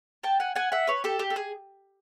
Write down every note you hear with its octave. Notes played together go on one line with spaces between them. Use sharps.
G5 A5
F#5 G#5
F#5 G#5
E5 F#5
B4 C#5
G4 A4
G4
A4
G#4